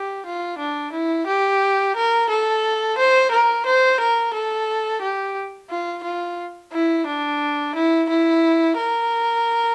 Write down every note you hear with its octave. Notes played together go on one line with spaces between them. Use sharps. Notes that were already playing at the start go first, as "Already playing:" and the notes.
Already playing: G4
F4
D4
E4
G4
A#4
A4
C5
A#4
C5
A#4
A4
G4
F4
F4
E4
D4
E4
E4
A#4